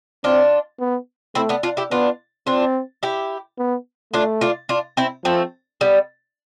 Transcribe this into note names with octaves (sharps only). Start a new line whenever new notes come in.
C4 D4 F4
B3
A3 C4 E4
B3 D4
D4 F4
E4 G4
B3 D4 F4
C4 D4 F4
E4 G4
B3
A3 D4 F4
D4 F4
D4 F4
C4 E4
F3 A3 C4
G3 B3